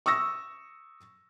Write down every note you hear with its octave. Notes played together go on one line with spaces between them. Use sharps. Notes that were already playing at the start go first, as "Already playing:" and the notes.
C#6 D#6 E6 A#6